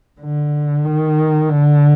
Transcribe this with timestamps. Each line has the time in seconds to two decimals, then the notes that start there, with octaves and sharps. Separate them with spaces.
0.21 D3
0.85 D#3
1.49 D3